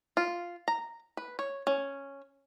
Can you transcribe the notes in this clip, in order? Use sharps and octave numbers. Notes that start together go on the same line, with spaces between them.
F4
A#5
B4
C#5
C#4